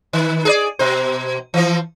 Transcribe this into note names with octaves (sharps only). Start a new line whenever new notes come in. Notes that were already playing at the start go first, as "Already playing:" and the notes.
D#3
G#4 A#4 D5
B2 C5
E3 F3